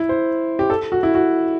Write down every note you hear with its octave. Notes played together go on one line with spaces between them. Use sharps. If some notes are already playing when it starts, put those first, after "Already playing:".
Already playing: E4
C5
G4
A4
F#4
E4
F#4